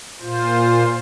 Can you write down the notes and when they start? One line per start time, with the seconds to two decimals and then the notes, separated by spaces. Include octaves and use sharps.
0.20 A#2 F4 C5